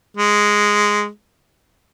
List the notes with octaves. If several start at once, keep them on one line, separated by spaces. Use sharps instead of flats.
G#3